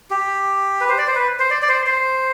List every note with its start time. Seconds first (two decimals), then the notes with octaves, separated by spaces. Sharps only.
0.11 G4
0.81 B4
0.89 C5
0.98 D5
1.07 C5
1.15 B4
1.39 C5
1.51 D5
1.62 D5
1.69 C5
1.87 C5